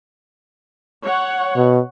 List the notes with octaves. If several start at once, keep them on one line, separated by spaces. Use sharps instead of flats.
C#5 F#5
B2